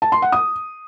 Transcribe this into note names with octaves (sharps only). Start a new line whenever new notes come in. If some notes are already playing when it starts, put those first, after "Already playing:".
A5
C6
F#5
D#6